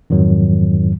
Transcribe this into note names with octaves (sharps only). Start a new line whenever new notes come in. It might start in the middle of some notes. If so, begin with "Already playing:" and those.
F2 G#2 D#3 F#3